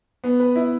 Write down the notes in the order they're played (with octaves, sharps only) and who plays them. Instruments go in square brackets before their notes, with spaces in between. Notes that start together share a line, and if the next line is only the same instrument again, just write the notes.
[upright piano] B3
B4
E4